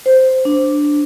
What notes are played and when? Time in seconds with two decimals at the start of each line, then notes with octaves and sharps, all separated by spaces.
0.06 C5
0.45 D4